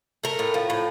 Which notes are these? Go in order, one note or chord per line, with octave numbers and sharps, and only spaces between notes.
A3 A#4
A2
F3
A2